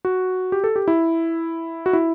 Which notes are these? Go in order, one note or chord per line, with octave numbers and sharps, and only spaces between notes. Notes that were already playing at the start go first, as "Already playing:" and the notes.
F#4
G4
A4
G4
E4
F#4
E4